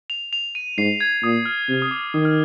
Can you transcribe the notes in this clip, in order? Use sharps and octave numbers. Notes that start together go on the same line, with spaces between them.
F7
F7
D#7
G#2 C7
G#6
A#2 D#6
F6
C3
D#6
D6
D#3 D#6
F6